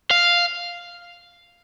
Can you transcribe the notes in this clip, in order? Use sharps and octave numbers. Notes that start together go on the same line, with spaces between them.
F5